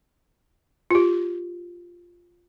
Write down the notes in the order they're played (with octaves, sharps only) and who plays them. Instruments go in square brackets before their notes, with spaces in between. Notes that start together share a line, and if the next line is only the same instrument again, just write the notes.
[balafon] F4 G4